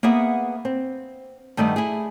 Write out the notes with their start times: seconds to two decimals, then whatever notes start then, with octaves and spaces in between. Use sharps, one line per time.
0.03 A#3 B3 G#4 E5 F#5
0.65 C4
1.57 G2 D#3 G3 A3 D#4 F#5
1.76 E4 G#4